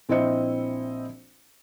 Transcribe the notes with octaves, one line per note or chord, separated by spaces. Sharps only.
A#1 C4 E4 C5 D#5 C#7